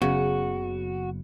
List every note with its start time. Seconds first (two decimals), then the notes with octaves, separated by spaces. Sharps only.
0.02 F#1 C#3 F#3 B3 F#4